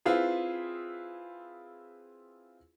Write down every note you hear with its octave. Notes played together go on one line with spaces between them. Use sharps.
C4 E4 F4 G#4 B4